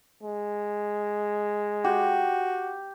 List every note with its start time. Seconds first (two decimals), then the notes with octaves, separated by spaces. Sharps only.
0.23 G#3
1.84 F#4 G4